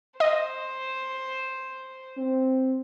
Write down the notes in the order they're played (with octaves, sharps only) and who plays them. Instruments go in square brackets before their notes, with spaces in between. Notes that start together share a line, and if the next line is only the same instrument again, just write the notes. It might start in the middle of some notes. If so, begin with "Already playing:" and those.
[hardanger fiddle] C5 [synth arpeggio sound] D#5
[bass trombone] C4